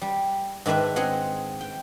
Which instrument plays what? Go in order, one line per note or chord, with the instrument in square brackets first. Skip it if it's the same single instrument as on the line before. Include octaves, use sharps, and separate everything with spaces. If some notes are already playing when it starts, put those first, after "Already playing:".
[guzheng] G3
G#2 D#3 D4 B4 E5
C4 G#4 D#5 F#5
G5